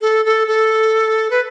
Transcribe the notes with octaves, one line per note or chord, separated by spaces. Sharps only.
A4
A4
A4
B4